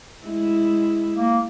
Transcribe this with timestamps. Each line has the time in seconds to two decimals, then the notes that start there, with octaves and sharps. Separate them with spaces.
0.25 G#3 E4
1.14 A#3